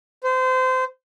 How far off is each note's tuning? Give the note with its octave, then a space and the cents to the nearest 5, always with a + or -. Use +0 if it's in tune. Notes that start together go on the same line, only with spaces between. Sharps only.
C5 -25